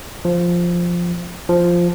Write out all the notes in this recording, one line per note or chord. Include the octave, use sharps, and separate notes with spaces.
F3
F3